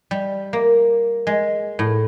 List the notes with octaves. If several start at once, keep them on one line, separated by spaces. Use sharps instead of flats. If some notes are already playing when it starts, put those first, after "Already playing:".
G3
A#3
G#3
A2